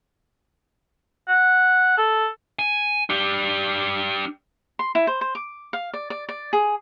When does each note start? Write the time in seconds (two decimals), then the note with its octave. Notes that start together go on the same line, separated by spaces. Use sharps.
1.28 F#5
1.98 A4
2.59 G#5
3.10 D4 G4
4.79 C6
4.95 E4
5.07 C5
5.21 C5
5.35 D6
5.73 F5
5.94 D5
6.10 D5
6.29 D5
6.53 G#4